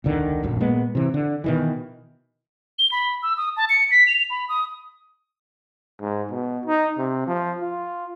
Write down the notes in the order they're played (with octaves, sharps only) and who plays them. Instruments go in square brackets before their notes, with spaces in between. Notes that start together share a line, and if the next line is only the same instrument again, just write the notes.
[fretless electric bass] E1 C#2 D3 D#3
D#1 A#1 F#2 F#3
A#2 G#3 B3
C3 E3
D3
B2 D#3 E3
[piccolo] G7
B5
E6
D#6
A5
C#7
B6
F7
B5
D#6
[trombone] G#2
B2
D#4
C3
F3
F4